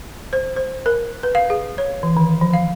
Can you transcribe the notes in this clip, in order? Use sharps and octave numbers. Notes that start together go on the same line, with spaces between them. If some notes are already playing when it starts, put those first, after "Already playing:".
C5
C5
A#4
B4
F5
G#4
C#5
E3
D#3
F3
F5